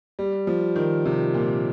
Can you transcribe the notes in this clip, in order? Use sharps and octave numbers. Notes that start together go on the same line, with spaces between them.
G3
F3
D#3
C3
A#2